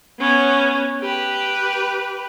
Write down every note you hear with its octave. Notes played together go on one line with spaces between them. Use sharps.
B3 C#4
G4 B4